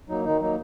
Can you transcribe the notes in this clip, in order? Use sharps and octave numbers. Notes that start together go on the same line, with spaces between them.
F#3 A#3 D#4
D#3 D#4
F#3 A#3 D#4